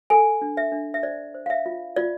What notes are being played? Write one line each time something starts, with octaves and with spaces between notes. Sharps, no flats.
A4 G#5
D4
E5
D4
E5
C5 D5
C5
F5
E5
F4
F4 D5